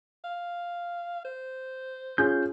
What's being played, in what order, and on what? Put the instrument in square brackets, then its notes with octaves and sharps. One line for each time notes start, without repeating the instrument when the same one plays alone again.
[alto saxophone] F5
C5
[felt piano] C#4 F4 G#4 [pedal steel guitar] G6